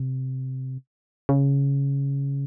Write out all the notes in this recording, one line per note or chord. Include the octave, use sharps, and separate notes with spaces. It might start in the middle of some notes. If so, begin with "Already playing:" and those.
Already playing: C3
C#3